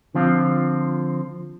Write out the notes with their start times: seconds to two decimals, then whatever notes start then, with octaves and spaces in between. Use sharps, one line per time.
0.15 D3 F3 C4 F4